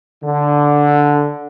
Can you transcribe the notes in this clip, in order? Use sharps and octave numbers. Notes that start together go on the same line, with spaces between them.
D3